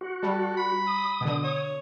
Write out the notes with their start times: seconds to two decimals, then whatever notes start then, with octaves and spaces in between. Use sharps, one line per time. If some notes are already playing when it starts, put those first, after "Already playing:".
0.01 F#4
0.23 G3 A4
0.57 B5
0.87 D#6
1.21 B2 D3
1.44 C#5